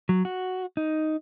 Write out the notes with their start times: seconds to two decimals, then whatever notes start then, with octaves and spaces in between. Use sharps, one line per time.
0.09 F#3
0.25 F#4
0.77 D#4